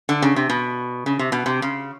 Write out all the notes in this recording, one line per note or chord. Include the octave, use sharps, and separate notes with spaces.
D3
C#3
C3
B2
C#3
C3
B2
C3
C#3